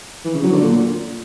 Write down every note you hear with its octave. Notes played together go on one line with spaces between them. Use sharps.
E3
C#3
F#3
D3
A#2